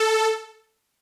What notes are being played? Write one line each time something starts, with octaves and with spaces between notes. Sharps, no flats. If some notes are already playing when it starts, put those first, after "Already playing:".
Already playing: A4